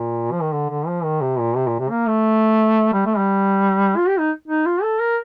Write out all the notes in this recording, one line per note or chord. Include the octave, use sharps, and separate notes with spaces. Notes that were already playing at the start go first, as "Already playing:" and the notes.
Already playing: A#2
F3
D#3
D3
D3
F3
D#3
C3
A#2
C3
A#2
C3
A#3
A3
G3
A3
G3
F4
G4
D#4
D#4
F4
A4
A#4